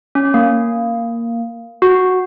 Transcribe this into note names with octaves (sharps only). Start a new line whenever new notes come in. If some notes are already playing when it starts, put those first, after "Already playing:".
C#4
A#3
F#4